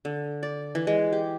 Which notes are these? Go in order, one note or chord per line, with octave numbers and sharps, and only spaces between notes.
D3
D5
E3
G#3
G4